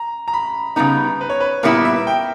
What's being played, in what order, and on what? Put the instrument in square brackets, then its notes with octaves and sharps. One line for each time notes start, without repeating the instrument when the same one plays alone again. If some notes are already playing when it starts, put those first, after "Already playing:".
Already playing: [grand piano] A#5
A#5
B5
[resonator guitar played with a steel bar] C#3 G3 B3 D#4 [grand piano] A#5
[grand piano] B4
C#5
B4
[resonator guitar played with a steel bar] A#2 G3 B3 E4 [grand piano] A#4
[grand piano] E5
G5